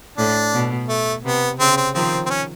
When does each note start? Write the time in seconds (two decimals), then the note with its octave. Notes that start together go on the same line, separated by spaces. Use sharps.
0.18 A2 D4
0.53 B2
0.89 A3
1.24 C3 B3
1.59 C#3 C4
1.77 C4
1.95 D#3 F3 C4
2.26 C4
2.30 C#4